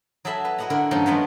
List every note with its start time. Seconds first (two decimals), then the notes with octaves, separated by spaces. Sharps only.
0.25 F#3 G#4 A4 E5 B5
0.45 B4
0.58 E4 F#4 D#5 F#5 A#5
0.70 D3 E4 A#4
0.91 G2 D#3 F3 A#3 C#4 D#4
1.06 F#3 G#3 A3 B3 D4